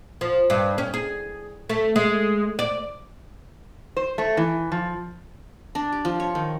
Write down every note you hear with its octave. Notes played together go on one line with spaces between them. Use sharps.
F3
G2
C#4
G#4
A3
G#3
D5
C5
A3
E3
F3
D4
G4
F3
C#5
D#3